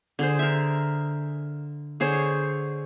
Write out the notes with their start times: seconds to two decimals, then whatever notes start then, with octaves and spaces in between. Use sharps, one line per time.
0.19 D3 G#4 C5
0.39 A#4 E5
2.00 D3 G#4 C5 C#5